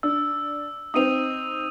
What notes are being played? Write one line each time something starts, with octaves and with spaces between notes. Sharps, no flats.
D4 E6
C4 D#4 D#6 D#7 F7